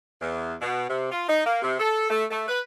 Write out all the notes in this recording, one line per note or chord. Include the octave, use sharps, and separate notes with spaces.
E2
B2
C3
F4
D#4
A#3
C3
A4
A3
A3
B4